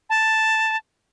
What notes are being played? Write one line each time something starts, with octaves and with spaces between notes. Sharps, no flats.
A5